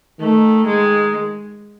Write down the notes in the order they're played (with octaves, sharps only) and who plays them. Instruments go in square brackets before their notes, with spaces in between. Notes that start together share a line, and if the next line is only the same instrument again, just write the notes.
[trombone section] D#3 [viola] A3
[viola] G#3